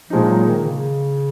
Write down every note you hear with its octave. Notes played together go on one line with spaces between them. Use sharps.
A#1 A#2 F3 G#3 D#4
F#3
D#3
C#3